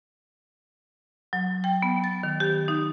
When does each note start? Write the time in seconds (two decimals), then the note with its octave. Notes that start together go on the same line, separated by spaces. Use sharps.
1.33 F#3
1.64 G5
1.82 B3
2.04 A6
2.23 D#3
2.40 G4
2.68 D#4